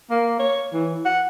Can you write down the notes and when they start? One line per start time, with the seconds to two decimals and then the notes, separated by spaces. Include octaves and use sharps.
0.11 A#3
0.40 C#5
0.73 E3
1.06 F#5